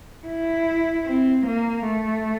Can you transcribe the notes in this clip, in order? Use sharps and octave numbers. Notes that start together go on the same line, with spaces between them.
E4
C4
A#3
A3